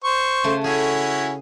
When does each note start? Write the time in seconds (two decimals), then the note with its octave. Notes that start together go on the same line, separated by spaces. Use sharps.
0.04 C5 C#6
0.44 C#3 A3
0.64 C#4 E4 F#4 G#4